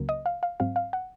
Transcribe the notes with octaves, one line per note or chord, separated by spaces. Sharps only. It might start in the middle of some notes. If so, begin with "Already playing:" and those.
Already playing: C#2 C#3 F#3 A#3
D#5
F5
F5
G#2 F#3 C4 F5
F5
F#5